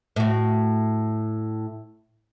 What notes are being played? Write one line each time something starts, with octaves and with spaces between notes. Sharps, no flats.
A2 F#4